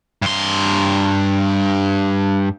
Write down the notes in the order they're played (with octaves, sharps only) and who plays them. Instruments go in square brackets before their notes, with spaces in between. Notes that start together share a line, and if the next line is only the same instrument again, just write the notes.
[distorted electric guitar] G2 C6